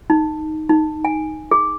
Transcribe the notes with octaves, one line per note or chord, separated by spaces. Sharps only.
D#4
D#4
G#5
G#4